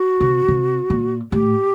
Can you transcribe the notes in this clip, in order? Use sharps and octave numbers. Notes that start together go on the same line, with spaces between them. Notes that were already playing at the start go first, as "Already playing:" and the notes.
Already playing: F#4
C3
C3
A#2
A2 G4